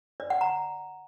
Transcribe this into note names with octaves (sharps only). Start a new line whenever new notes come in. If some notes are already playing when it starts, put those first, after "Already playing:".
D5
F#5
A#5